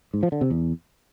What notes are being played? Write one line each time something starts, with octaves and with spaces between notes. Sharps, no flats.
G#2
F3
D3
C3
E2